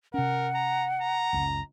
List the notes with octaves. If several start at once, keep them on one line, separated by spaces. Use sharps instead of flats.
C3 C#4 A#4 F#5
A#5
A#5
F#1 C#2